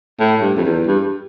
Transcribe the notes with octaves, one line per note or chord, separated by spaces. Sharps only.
A2
G2
F2
E2
G2